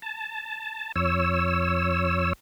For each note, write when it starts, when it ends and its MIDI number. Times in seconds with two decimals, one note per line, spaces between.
0.02 0.92 81
0.96 2.33 41
0.96 2.33 73
0.96 2.33 88